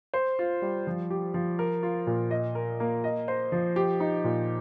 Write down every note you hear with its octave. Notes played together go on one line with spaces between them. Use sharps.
C5
F4
G3
F3
G4
F3
A#4
F4
A#2
D#5
A#4
A#3
D#5
C5
F3
G4
D#4
A#2